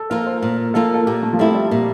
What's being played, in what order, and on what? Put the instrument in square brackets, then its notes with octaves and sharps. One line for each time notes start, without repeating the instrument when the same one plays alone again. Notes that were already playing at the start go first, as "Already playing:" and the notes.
Already playing: [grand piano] A4
[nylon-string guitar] F3 A#3 F4 [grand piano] A#4
[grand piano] C5
[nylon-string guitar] A#2 [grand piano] A#4
[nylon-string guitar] F3 A#3 F4 [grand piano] A4
[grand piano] A4
[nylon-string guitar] A#2 [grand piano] G4
[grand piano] A3
F3
[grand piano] G3 [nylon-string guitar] A3 C4 E4
[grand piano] G3
[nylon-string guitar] A#2 [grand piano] G3